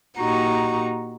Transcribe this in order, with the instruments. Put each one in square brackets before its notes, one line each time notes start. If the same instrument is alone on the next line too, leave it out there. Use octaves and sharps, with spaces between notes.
[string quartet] A#2 D#4 F#4 G4 A#5 C#6